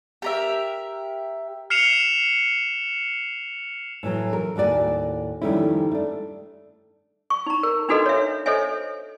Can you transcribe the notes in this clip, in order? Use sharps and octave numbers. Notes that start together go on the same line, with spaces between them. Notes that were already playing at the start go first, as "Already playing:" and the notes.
G4 A#4 E5
F6 C7 C#7 E7 F7
A2 E3 F#3
A#4
D#2 A2 F#4 D5 G#5
F2 D#3 G3 A3 C#4 E4
A3 D4
C#6
D#4 A#5
A#4
D4 D#4 F#4 A4 B4 D#5
C#5 E5
A4 C5 C#5 D#5 E5 G#5